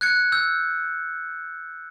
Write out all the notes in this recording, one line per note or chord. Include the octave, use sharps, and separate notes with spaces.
F#6 G#6 C#7
E6 G6